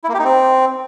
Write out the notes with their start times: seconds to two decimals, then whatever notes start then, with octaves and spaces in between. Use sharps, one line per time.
0.04 E4
0.09 A#3
0.14 G4
0.19 D#4
0.24 C4